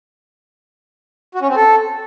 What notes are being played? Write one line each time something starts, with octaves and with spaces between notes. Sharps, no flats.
F#4
C#4
C4
A4